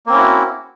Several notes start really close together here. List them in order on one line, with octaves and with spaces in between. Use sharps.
A#3 C4 C#4 E4 F#4